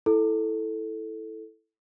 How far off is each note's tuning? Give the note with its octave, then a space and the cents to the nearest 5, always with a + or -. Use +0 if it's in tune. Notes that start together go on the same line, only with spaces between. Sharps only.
E4 -5 A4 +0